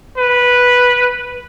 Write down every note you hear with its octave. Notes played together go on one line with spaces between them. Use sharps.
B4